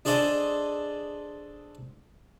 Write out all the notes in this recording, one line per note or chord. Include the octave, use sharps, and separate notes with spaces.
D4 G#4 A4 C5 D5 D#5